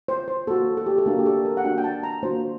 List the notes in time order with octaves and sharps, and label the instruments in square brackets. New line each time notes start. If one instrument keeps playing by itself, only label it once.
[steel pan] C5
C5
A#3 F#4 A4
A4
G4
A4
A#3 D4 F#4 A#4
G4
A4
A#4
F#5
A#3 D4 F#4 G5
G5
A5
A#5
A#3 D4 F#4 C5